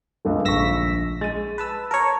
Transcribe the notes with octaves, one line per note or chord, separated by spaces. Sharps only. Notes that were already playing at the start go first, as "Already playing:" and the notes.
C#2 G2 A3
A#1 C#6 E6 A#6 B6
G#3 A6 D#7
B4 A5 E6
A#4 C#5 A5